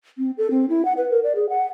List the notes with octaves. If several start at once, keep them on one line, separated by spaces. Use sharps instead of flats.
C4
A4
C4
E4
F#5
B4
A#4
D5
G#4
F#5